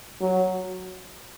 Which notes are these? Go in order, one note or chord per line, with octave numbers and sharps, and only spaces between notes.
F#3